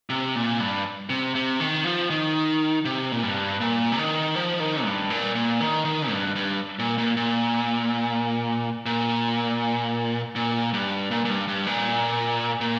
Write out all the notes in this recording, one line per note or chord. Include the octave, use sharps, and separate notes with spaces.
C3
A#2
G2
C3
C3
D#3
F3
D#3
C3
A#2
G2
A#2
C3
D#3
F3
D#3
G2
A#2
A#2
D#3
D#3
G2
G2
A#2
A#2
A#2
A#2
A#2
G2
A#2
A#2
G2
G2
A#2
A#2